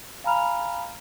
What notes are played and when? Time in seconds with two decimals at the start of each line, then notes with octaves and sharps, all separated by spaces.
0.24 F5 G#5 A#5 B5 F6 F7